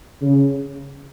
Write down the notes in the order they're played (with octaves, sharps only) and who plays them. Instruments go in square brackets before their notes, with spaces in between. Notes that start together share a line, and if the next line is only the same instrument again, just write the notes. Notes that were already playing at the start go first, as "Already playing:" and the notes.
[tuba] C#3